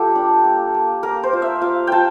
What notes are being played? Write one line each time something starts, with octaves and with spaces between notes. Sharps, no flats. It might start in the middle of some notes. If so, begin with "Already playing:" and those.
Already playing: G3 F4 G4 A4
D4
A#3
A#3
A#3 A#4
C5
F4
E5
F4 F5
F4 G5 A5